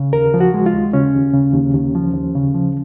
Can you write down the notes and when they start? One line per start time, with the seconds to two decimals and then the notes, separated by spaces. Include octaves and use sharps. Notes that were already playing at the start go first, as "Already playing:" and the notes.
Already playing: C#3
0.13 D#2 A#4
0.34 F3
0.40 F#4
0.54 G#3
0.66 F4
0.74 D#2
0.93 C#3 C#4
1.14 D#2
1.33 C#3
1.54 D#2
1.74 D#2
1.95 F3
2.14 D#2
2.35 C#3
2.55 F3